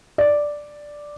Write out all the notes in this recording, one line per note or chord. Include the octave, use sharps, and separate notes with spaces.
D5